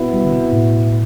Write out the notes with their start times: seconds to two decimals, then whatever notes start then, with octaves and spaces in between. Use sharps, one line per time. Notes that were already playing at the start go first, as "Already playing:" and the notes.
Already playing: B2 B3 E4
0.13 G3
0.24 D3
0.32 C3
0.52 A2